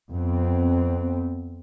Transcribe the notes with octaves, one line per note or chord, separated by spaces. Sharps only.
F2 B3 C4